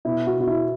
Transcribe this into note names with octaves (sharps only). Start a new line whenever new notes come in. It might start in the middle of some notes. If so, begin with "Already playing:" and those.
B2 E4
F#4
B2 F#4
E4